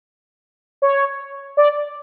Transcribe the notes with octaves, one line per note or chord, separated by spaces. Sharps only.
C#5
D5